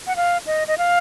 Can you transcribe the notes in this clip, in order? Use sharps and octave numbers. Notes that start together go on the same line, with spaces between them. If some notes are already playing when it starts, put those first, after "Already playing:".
F#5
F5
D#5
D#5
F5